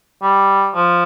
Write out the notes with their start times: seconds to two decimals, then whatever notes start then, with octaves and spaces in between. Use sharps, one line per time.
0.23 G3
0.75 F3